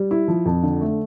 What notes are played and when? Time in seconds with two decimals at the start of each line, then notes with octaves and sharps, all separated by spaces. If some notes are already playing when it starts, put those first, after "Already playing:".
Already playing: G3
0.11 E4
0.28 F3
0.45 F2
0.63 D3
0.81 A3